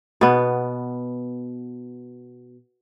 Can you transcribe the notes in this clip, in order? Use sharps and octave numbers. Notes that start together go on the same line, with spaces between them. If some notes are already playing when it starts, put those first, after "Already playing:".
B2 B3